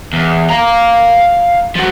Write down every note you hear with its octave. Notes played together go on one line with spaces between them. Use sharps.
E2
F5 A#5
F3 F#4